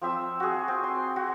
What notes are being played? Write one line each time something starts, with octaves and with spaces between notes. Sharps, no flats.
F3 C4 E5 E6
F#4 G#4
C4
C6
F#4